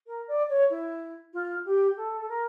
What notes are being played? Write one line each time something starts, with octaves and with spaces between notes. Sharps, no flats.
A#4
D5
C#5
E4
F4
G4
A4
A4
A#4